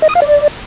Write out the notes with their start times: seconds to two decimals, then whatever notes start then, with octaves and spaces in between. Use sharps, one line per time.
0.02 D#5
0.09 D#6
0.15 F5
0.22 D5